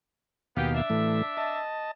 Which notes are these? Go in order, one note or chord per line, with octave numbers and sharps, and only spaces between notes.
D#2 B2 B3 G4 F5
D4 E5
A2 E3 A3
D#5 A5